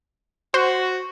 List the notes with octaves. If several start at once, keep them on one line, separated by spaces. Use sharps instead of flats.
F#4 C5